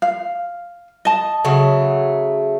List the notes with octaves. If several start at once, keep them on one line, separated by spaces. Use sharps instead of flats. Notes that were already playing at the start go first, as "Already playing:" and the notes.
F5
D#5 A5
C#3 F#3 A3